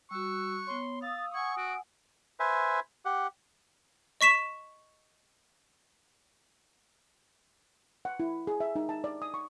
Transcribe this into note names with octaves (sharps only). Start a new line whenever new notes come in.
G3 F#4 C#6 E6 F#6
B3 C#5 C6
F5 D#6 E6 A6
F#5 G#5 C#6 G#6
F#4 D7
B4 C5 E5 G#5
G4 F#5
D#5 C#6 B6 E7
F#5
E4
G#4
E5
D#4
A5
D5
D#6
C#6